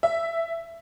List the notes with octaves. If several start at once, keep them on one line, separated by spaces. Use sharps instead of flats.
E5